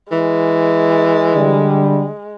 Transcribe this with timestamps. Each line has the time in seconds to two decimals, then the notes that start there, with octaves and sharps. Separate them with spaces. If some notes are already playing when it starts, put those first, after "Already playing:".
0.11 E3 G#3
1.34 D3 G3